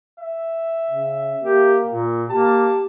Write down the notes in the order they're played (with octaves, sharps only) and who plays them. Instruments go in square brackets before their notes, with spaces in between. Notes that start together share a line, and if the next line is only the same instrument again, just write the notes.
[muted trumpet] E5
[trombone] C#3
[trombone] A#3 [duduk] G4
[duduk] A#2
[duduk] A#3 [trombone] G4 [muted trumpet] A5